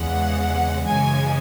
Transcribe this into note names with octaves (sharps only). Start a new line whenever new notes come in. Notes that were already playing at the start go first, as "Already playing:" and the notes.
Already playing: E2 C#3 E3 G#3 F#5
F#2 C#3 E3 G#3 G#5